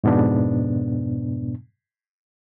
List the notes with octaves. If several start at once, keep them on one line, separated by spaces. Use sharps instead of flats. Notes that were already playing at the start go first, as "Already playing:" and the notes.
F2 G#2 B2 B3 D4